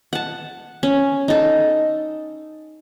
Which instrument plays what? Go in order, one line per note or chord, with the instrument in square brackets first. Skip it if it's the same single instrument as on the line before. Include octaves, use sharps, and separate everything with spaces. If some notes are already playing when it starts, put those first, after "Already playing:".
[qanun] F#5 A5
C#4
D#4 A4